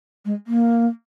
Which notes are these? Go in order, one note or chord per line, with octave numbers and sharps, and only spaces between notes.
G#3
A#3